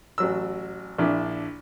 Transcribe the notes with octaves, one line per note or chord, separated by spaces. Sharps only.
A1 F#3 E6
A#1 D4 E4